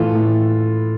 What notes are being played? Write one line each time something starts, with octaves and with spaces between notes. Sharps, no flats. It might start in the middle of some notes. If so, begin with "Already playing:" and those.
Already playing: A2 E3 F4 A4
A2